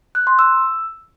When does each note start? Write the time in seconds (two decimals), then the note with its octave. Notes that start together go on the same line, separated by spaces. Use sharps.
0.15 F#6
0.27 C6
0.39 E6